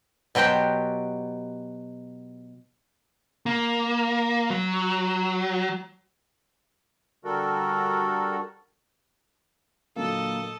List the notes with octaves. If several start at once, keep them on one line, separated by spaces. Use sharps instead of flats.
B2 F#3 G4 C5 G5
A#3
F#3
D3 G3 F#4 A4 A#4
A#2 D3 F#3 A#3 A4 D#5